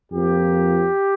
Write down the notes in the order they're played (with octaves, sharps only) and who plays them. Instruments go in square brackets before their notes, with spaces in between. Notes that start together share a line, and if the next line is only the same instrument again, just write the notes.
[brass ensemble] F2 F3 A#3 G4